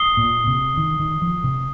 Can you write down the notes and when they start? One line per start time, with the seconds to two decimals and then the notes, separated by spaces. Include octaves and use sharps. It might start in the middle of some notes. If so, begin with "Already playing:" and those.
Already playing: D#6 C7 G7
0.17 A#2
0.47 C3
0.77 D#3
1.00 D#3
1.22 F3
1.44 C3